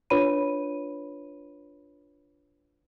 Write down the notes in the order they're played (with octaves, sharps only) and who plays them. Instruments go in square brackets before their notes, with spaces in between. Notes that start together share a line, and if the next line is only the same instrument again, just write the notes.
[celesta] D4 F4 B4 C#5 B5 D#7